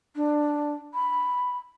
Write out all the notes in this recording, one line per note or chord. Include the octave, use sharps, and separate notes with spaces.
D4
B5